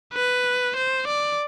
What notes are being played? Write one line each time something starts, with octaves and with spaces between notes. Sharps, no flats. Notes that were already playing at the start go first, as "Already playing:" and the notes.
B4
C5
D5